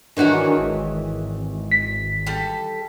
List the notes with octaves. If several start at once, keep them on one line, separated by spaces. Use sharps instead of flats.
D#3 E3 G#3 D4 F#4 A#4 C#5
G#1
B6
G3 A4